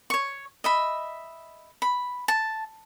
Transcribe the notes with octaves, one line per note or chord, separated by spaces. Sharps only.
C#5 C#6
D#5 E5 B5
B5
A5